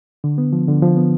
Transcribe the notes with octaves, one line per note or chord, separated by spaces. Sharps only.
D3
B3
F3
D3
F3
B3